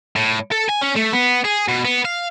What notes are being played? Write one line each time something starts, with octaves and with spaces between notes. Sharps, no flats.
A2
A4
G#5
C#4
A3
B3
G#4
B2
B3
F5